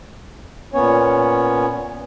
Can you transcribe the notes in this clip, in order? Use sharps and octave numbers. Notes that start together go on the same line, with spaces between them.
A#2 B3 C#4 C#5